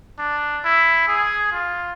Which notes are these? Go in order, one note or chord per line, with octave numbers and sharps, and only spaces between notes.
D4
E4
G#4
F4